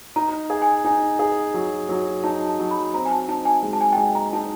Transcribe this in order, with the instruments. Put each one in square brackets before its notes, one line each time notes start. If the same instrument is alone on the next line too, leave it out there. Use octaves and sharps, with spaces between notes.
[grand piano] D#4 [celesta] A#5
[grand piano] G#4
[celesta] G#5
[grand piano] D#4 [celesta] G#5
[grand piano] G#4
F#3
F#3
[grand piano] D#4 [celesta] A5
[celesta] A5
[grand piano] F#3
[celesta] B5
[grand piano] C4 [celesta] A#5
[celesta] G#5
A5
[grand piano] D#4 [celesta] A5
[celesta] G#5
[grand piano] G#3
[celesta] A5
G#5
G5
[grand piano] G#3 [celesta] G#5
[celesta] A#5
[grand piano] D#4 [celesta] A5